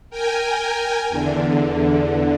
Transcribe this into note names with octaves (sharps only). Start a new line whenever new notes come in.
A#4 G5 G#5
E2 D3